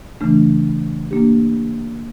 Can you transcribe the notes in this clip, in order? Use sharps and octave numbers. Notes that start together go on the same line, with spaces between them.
C#3 E3 A3 D4
A#3 D4 G4